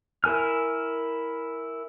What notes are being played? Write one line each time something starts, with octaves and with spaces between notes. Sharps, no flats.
E4 A#4 G#5 F6